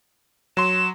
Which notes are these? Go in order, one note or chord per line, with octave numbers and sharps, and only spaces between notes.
F#3 C6 E7